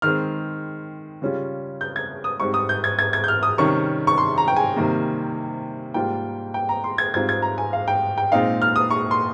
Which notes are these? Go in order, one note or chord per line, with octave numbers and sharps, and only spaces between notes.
D#3 G#3 C4 F6
C#3 G3 C#4 F4
G6
G#6
D#6
G#2 G3 C4 C#6
D#6
G6
G#6
G#6
G#6
G6
F6
D#6
C3 D#3 G3 C#4 C#6
C#6
C6
A#5
G5
G#5
C3 D#3 G3 A#3
G#2 G3 A#3 F4 G5
G5
A#5
C6
G#6
G#2 G3 C4 F4 G#6
G#6
A#5
G#5
F5
G5
G5
A#2 G#3 C4 D#4 F5
F6
D#6
C#6
C6